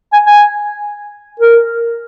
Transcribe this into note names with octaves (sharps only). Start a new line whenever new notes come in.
G#5
G#5
A#4